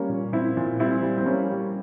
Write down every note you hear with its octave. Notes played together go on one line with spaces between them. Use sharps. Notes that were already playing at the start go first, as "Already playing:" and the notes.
Already playing: G3 A#3 C#4
A#2
A#2 C4 E4
A#2
G3 C4 E4
G3
C4
G3 A#3 C#4
G3